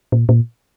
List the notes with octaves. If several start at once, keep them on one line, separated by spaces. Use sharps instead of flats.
A#2
A#2